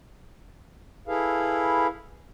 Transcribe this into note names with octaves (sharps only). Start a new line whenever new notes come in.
E4 G#4 A4 B4 F5